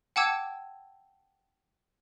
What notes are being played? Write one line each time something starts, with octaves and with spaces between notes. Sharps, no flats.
F#5 G5 A5 D6 E6 G#6